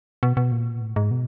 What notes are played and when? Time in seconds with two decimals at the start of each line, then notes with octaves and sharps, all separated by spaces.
0.23 B2
0.37 B2
0.52 A#2
0.81 A2
0.96 G#2
1.11 B2